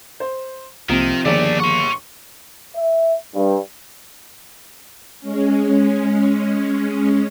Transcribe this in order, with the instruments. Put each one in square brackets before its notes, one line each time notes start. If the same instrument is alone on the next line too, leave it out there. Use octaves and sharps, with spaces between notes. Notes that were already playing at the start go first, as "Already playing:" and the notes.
[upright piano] C5
[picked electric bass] C2 A#3 [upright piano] C3 F3 [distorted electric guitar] D#3
[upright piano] G1 D#2 G#4 [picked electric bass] D#3 F3 [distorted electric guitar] A3 D4 [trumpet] D5
[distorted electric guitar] F#5 C6 [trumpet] C#6
[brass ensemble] E5
G2
[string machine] G#3 C#4